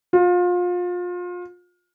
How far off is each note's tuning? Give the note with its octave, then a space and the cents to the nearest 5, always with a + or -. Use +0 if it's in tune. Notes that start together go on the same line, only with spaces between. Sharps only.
F4 +30